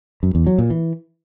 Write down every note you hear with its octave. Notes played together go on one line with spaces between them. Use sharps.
F#2
E2
F#3
A#2
E3